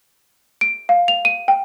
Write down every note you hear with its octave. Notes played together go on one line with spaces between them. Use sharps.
D7
F5
F7
D#7
G5